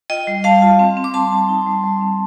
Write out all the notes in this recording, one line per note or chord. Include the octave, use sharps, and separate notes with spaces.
F4 D#5 G5
G3
G3 F5 A5
F4
C4
C4
D6
G3 A5 C6
C4
D#4
G3
G3
C4